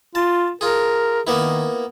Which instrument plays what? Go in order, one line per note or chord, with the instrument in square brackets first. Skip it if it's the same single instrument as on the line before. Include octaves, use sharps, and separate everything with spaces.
[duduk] F4 [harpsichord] A5
[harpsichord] F4 G#4 [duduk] A#4
[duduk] D#3 [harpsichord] A#3 B3 E4